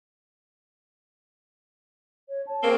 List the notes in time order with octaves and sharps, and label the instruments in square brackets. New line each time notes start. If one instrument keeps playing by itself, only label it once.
[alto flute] C#5
A5
[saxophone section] C#3 A#3 C4 [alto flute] A#4